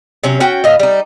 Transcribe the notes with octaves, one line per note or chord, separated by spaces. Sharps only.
C3 F#3 C#4
C#4 F#4 G5
A2 D#5 F5
G3 D#4